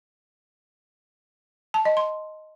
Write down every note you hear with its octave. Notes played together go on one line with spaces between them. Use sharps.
A5
D#5
C6